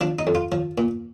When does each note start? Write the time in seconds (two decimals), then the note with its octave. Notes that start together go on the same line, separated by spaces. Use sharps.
0.01 F3 D4
0.19 D#4
0.27 F2
0.35 F4
0.52 F3
0.78 A#2